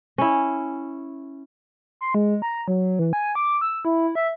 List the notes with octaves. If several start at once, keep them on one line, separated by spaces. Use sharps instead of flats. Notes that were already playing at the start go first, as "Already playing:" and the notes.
C#4 E4
C6
G#3
A#5
F#3
E3
G#5
D6
E6
E4
E5